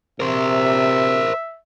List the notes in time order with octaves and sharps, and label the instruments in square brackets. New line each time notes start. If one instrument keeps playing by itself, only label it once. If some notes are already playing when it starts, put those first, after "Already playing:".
[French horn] C3 [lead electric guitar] A#4 C5 [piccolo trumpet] E5